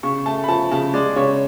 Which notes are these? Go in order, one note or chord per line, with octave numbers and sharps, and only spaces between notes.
C#3 C#6
A3 A5
B5
F3 A5
C#3 A5
G#3 D5
C#3 C#5